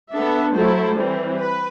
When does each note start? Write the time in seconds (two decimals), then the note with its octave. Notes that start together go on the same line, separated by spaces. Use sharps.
0.11 B3 D4 A4 E5
0.54 F#3 A3 E4 A4 C5
0.97 E3 G3 C4
1.39 B4